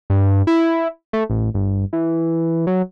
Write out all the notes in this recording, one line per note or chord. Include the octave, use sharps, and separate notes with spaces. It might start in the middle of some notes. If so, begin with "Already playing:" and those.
G2
E4
A3
A1
G1
E3
F#3